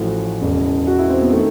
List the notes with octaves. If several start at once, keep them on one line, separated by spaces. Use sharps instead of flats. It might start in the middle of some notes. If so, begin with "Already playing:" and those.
Already playing: A1 A2 F3 F#4
E1 E2 C#3
F#4
E4
C4
B3
D#3 A3